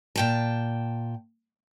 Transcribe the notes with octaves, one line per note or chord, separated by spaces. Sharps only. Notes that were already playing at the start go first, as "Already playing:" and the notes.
A#2 G5 A5